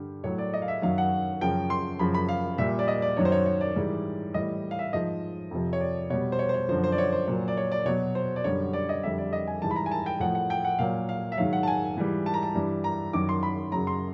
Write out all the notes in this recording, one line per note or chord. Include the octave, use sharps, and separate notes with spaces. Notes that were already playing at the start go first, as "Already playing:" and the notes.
Already playing: G2 D3 G3
A2 F#3 C#5
D5
D#5
F5
E5
F#2 D#3 F#3 F5
F#5
F#2 C#3 F3 G5
C6
F#2 C#3 F3 B5
B5
F5
A#2 G3 E5
D5
D#5
D5
F#2 D#3 F#3 C#5
C5
C#5
C#5
D5
G#2 E3 G3
A2 E3 G3 D#5
F5
E5
G#2 F3 D#5
F2 C3 F3
C#5
D5
B2 G3 C#5
C5
C#5
C5
C#5
F#2 D3 F3 C5
C5
D5
C#5
C5
A#2 F#3
D5
C#5
D5
B2 F#3 C#5
C5
D5
F#2 D3 G3 C#5
D5
D#5
F2 D3 G3 E5
D5
D#5
G#5
G#2 E3 G3 A5
B5
A#5
G#5
A5
G5
A2 F3 F#5
F#5
G5
F#5
A#2 F#3 F5
F5
E5
G#2 D#3 F#3 F5
F#5
A5
G#5
G#2 E3 G3
A5
A#5
A5
G2 E3 G3
A#5
F#2 D#3 F#3 D6
C6
B5
F#2 C#3 F#3 A#5
C6